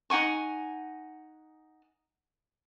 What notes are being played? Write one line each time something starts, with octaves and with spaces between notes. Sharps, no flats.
D#4 F#5 G#5 C#6